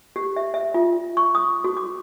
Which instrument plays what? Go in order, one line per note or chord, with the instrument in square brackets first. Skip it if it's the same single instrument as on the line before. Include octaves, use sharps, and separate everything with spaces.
[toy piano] G4
E5
E5
F4
C#6
D#6
F#4
D6